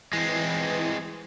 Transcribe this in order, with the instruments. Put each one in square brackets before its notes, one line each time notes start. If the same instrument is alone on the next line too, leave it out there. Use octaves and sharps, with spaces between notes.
[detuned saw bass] E3 [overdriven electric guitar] G#3 C4